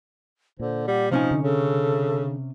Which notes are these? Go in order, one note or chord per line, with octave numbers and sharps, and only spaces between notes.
A#2 D3 C5
G3 F#5
C3 F3 C#4 D#4 G#5
D3
C#3 A4